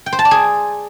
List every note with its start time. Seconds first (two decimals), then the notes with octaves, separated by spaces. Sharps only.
0.06 G5
0.13 C5
0.19 A5
0.25 D5
0.31 G#4